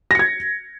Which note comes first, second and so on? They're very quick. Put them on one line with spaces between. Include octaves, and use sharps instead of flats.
A#6 C#7 G#6